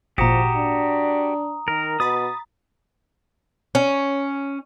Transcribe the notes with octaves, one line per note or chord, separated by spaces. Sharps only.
G#1 A#2 F3 F#4 G4 A#5 D#6
D4
D#3 A#4
B2 B5 D#6 A6
C#4